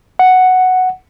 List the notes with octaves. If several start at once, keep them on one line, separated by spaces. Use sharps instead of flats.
F#5